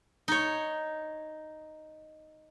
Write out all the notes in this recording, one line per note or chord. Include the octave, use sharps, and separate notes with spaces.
D#4 C#5